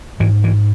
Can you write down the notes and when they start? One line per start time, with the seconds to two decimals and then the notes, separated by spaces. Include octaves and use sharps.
0.20 G#2 E3
0.44 E3